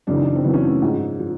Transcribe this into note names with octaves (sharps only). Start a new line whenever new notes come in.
F#2 C#3 E3 D4
D#4
D4
C4
F#2 C#3 E3 B3
C#4
A3
G#2 F3
F3